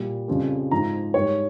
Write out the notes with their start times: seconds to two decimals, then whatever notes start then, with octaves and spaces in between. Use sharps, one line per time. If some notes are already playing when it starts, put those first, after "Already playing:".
Already playing: A#2 G3
0.28 F2 C#3 G3
0.71 G#2 F3 A#5
1.14 G#2 G3 C#5